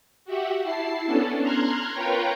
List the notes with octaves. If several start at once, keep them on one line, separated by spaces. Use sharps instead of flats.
F#4 G4 E5 F#5
E4 A5 C7
B3 C#4 D4 A4
A#5 C6 F6 F#6 G#6
F4 A#4 B4 C#5 G5 A#5